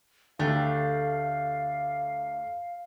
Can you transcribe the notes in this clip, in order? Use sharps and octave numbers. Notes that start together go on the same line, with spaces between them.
D2 A3 D4 G4 F5